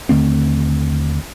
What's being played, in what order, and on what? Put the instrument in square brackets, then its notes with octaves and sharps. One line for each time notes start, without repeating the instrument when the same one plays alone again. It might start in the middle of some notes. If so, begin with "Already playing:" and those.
[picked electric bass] D#2 D3 A3 C4